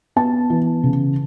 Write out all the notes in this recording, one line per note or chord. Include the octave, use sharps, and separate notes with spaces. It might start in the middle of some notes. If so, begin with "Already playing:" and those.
B3 A5
E3
C#3